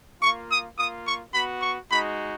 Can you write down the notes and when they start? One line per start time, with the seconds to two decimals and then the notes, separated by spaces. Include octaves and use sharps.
0.21 A#3 F4 C#6
0.50 D#6
0.77 A#3 F4 D#6
1.06 C#6
1.34 B3 F#4 B5
1.62 C#6
1.91 G#3 D#4 F#4 B5